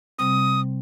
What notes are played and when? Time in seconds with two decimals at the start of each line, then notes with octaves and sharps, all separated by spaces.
0.19 C3 G3 C4 D#6